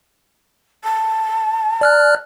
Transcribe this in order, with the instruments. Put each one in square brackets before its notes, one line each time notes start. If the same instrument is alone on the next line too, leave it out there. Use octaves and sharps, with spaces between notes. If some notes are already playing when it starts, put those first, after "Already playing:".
[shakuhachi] A5
[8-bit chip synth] D5 F6 F#6